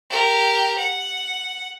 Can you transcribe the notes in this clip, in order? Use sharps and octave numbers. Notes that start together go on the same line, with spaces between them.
G4 A#4
F#5